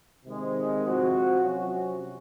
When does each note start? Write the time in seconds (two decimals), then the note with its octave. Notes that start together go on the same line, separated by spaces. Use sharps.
0.25 C3 D#3 G#3 C4
0.83 F3 C4 F#4
1.40 C3 F#3 C#4 F#4